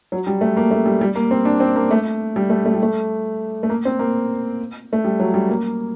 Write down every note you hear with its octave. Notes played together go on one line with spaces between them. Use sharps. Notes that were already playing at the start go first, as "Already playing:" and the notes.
F#3
G3
A3
A#3
A3
G3
G3
A#3
C4
D4
C4
A#3
A3
G3
A3
A3
G3
A3
A3
A#3
C4
A#3
A3
G3
F#3
G3
A#3